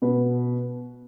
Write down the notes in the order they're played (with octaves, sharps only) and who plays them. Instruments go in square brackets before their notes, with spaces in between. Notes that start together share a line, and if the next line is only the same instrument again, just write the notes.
[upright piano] B2 B4